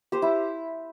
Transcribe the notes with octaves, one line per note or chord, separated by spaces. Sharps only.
G4 C5
E4